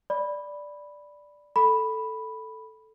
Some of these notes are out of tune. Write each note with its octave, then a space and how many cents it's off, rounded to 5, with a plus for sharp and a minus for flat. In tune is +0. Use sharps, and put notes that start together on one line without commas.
D5 +0 B5 +0
A4 +0 B5 +0